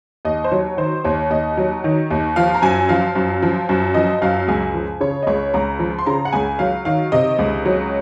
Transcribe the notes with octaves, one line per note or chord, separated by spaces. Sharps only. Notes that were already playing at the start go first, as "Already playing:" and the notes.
D#2 D#5
C5
F#3 C#5
D#3 C5
D#2 C#5
D#2 D#5
F#3
D#3
D#2
F3 F5
A#5
F#2 G#5
F3 F5
F#2
F3
F#2
F3 D#5
F#2 F5
C#2 G#5
F3
C#3 C#5
D#5
C#2 C#5
C#2 A#5
F3
C6
C#3 A#5
F#5
C#2 G#5
F#3 F5
D#3 F5
C3 D#5
C#2
F#3